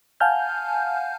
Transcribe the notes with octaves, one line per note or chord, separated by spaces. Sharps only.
F5 F#5 G#5 A5 F6 G6